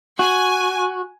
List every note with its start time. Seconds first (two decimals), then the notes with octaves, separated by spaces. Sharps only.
0.19 F#4 G#5